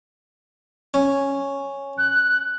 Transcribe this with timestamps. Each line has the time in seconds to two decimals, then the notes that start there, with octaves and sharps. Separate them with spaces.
0.94 C#4
1.98 F#6